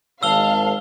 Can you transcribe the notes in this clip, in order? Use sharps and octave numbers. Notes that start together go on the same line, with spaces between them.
G#1 F5 A5 E6 G7